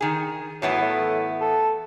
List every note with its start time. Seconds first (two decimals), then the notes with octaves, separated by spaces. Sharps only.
0.01 D#3 G#4
0.62 A2 E3 F#3 B3
0.81 A3
1.41 A4